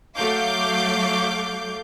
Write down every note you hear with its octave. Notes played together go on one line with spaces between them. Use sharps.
F#3 A3 F5 D6 G6